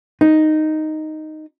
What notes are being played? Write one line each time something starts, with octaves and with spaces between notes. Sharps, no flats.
D#4